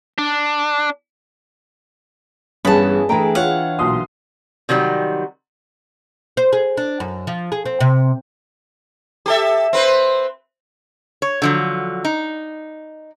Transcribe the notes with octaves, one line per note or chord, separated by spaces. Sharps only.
D4
G2 E3 B3 C#4 G#4 A5 B5
E3 A3 D4 G5 A#5
F4 C#5 F5 F#5
B1 A#2 C6 D#6
C3 D#3 F#3 G3
C5
G#4
D4
F#2
F3
G#4
C4
C3
G4 A4 E5
C4 B4 C5
C#5
D3 F3 F#3
D#4